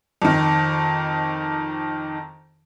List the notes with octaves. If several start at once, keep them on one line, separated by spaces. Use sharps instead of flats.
F2 D#3